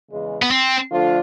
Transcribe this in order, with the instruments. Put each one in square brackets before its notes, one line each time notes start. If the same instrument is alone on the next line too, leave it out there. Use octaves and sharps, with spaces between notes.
[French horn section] E2 C#3 E3 G#3
[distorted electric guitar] B3
C4
[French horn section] D3 F3 A3 D4 F4